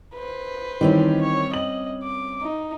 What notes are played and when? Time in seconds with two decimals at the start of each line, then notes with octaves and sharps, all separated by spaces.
0.15 B4 C5
0.81 D#3 E3 G3 C4 C#4
1.21 C#5
1.54 D#5 F#7
2.04 D6
2.43 D#4